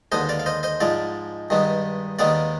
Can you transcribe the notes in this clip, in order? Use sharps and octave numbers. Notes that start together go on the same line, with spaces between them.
D#2 D3 G#3 B3 C5 D#5
D5 F5
F5
C5 D#5
C5 D#5
G#2 F3 G#3 D5 F5
G2 D#3 G#3 B3
D#2 D#3 G#3 B3 D5 F5